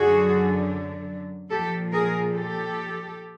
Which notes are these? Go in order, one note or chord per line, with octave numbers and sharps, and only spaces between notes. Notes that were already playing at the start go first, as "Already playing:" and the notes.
Already playing: F#2 D3 F#3 F#4 G#4
A#2 F3 G4 A4
G#4 A#4
G4 A4